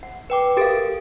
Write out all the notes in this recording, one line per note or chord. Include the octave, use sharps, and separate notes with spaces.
F#5
B4 G5 D6
G4 A4 A#4 F5 A6 D7